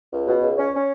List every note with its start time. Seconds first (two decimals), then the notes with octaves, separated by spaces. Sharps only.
0.12 C#2
0.27 B2
0.42 C#2
0.57 C#4
0.73 C#4